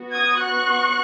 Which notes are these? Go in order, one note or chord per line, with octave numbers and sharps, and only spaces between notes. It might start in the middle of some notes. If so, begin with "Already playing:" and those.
Already playing: B3 F#4
D#6 G#6
C#6 F#6